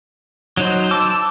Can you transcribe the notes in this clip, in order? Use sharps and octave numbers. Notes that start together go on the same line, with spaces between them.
F#3 D#4 C5
A5 D6 E6